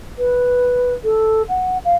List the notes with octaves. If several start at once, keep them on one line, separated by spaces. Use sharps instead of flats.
B4
A4
F#5
F5